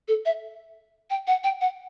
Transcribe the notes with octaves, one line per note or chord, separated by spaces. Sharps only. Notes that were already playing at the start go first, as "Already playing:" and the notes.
A4
E5
G5
F#5
G5
F#5